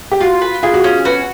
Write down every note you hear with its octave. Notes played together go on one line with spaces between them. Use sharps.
G4
F4 F#4
B4
F4 G#4
F#4
C#4 F4
F#4 B4